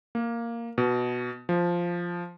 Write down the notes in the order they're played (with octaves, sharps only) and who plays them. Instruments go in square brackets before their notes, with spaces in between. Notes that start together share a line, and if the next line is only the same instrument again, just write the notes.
[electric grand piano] A#3
B2
F3